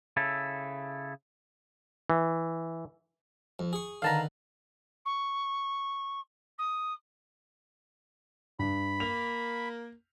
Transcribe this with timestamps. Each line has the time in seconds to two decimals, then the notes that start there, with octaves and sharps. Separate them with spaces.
0.17 C#3 E4 A4
2.10 E3
3.59 F2
3.73 G#4 C#6
4.02 D3 D#3 B4 F5 A5 A#5
5.05 C#6
6.58 D#6
8.59 G2 B5
9.00 A#3 F7